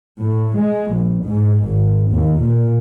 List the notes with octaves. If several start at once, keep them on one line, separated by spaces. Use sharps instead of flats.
A2
G#3
A#1
G#2
G#1
D#2
A#2